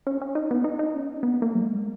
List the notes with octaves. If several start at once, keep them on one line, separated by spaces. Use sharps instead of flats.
C#4
C#4
D#4
B3
D#4
D#4
C#4
B3
A#3
F#3
G#3